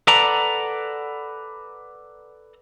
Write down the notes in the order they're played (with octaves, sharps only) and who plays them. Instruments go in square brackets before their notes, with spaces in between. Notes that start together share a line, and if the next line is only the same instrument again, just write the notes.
[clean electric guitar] A4 B4 D5 F#5 A5 A#5